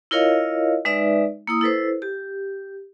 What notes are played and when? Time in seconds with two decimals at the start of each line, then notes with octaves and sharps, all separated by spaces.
0.11 E4 F4 A#4 C#5 D#5 F5
0.85 G#3 D#4 B4 D5 E5
1.47 A#3 E4 D#6
1.61 E4 A4 B4 C5
2.02 G4